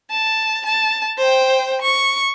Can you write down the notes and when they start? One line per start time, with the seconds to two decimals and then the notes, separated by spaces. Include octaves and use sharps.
0.11 A5
0.66 A5
1.18 C5 G5
1.82 C#6